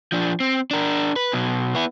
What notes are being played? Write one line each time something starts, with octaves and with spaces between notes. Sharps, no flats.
F3 D4
C4
D4 A#4
B4
B2 F#3
B3 E4